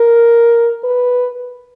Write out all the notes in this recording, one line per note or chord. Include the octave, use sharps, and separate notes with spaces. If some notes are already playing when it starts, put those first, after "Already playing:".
Already playing: A#4
B4